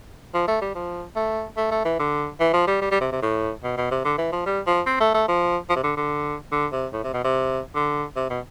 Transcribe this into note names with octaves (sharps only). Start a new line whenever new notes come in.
F3
A3
G3
F3
A3
A3
A3
E3
D3
E3
F3
G3
G3
G3
C3
C3
A2
B2
B2
C3
D3
E3
F3
G3
F3
C4
A3
A3
F3
F3
C3
D3
D3
D3
C3
A2
C3
B2
C3
D3
C3
B2